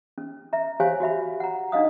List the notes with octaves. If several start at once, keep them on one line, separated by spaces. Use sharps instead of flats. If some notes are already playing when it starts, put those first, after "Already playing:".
C#4
E5 A#5
G4 C5 C#5 F5 G#5
F#4 G4 E5 B5
F#5 A#5
D4 D#4 D#5 F5 D#6